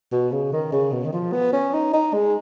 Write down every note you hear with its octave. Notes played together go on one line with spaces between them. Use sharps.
B2
C#3
D#3
C#3
B2
D#3
F3
B3
C#4
D#4
D#4
G#3